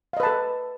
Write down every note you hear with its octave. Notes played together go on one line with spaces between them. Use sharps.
A4 B4 D#5 F5 A5